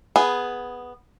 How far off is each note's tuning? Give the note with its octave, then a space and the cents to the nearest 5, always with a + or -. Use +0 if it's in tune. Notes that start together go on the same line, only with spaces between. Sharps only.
B3 +0 G#4 +0